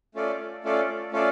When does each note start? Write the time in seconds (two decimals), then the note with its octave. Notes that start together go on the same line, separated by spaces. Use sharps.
0.14 A3 C#4 F4 A4 D5
0.64 A3 C#4 F4 A4 D5
1.12 A3 C#4 F4 A4 D5